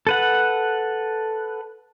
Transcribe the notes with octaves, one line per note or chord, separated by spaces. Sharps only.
A4 B4 F#5